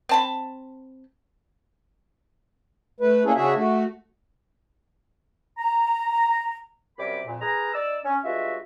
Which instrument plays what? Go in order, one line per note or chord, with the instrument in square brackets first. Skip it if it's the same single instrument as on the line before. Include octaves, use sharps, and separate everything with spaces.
[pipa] C4 A5 B5
[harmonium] A3 B4
A#3 C#4 D4 E4 G#4 A4
C#3 D4 F#4 G#4 E5
A3 F#4
[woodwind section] A#5
F#2 C3 G3 A#4 B5 D6
F2 A#2
G#4 A#4 B4 A#5
D#4 D5 E6
C#4
G2 G#3 F4 F#4 E5